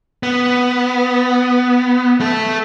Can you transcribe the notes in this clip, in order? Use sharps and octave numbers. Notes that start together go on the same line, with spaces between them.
B3
A3 A4